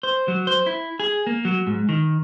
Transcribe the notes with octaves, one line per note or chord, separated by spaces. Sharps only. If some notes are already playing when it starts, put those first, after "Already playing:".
C5
F#3
C5
E4
G#4
A#3
F#3
G#2
D#3